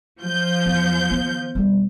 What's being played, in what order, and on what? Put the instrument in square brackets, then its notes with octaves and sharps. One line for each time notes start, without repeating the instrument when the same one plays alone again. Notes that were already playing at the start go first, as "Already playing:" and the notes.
[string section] F3 G6
[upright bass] E2
D#3 B3
E1 G3